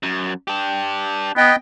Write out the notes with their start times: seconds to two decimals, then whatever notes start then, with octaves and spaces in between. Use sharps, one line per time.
0.03 F#2
0.48 D4 G4
1.37 B3 D#5 G5